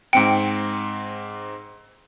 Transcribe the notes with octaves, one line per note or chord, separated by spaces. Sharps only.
G#2 C4 G5 C#7